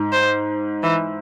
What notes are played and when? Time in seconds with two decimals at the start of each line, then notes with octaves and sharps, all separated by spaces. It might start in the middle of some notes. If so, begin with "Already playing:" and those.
Already playing: G#2
0.12 C5
0.83 E3